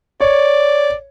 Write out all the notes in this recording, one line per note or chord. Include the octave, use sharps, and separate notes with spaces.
C#5 D5